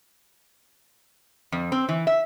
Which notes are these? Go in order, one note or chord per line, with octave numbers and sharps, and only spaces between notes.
F2
C4
E3
E5